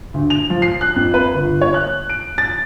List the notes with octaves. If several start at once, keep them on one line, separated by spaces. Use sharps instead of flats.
D2
F7
F3
C7
F#6
F2
B4
G1
C#5
F#6
D7
A6